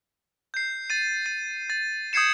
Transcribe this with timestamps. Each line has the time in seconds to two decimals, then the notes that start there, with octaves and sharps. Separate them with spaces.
0.54 G6 C7
0.90 A6 D#7
1.26 A6 D#7
1.70 A6
2.13 D#6 G6 G#6 C7 C#7 E7